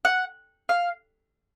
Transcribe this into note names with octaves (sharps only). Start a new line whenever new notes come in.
F#5
F5